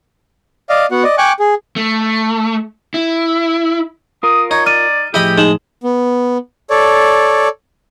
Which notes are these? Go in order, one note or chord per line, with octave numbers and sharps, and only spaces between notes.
D5 D#5 F5
B3 F#4 F#5
D5 D#5
G5 G#5 C#6 D6 F#6
G#4
A3
E4
F4 A#4 D#6
D#4 C#5
D5 F6 D#7
A2 F3 E4 G4 G#4 D#5 B5
G#3 D#4 E7 F#7
B3
A4 C#5 D5